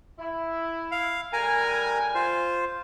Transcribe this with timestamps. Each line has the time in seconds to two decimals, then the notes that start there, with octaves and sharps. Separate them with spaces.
0.19 E4
0.92 F5
1.33 A2 G3 A#4 G#5 A#5
2.15 F4 C5